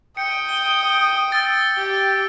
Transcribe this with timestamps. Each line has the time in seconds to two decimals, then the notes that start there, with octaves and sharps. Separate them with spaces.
0.17 G5 D#6 C#7
0.49 G7
1.32 E6 A6
1.77 G4